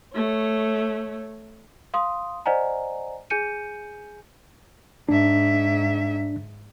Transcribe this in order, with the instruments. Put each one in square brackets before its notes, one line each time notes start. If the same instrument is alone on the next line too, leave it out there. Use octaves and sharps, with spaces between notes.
[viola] A3 C#5
[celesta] F5 C6 D#6
C5 D5 D#5 F#5 G#5 A#5
G#4 G#5 G6 C#7 D#7
[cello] G#2 E5 [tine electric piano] D4